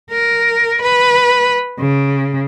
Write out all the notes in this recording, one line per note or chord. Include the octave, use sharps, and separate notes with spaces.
A#4
B4
C#3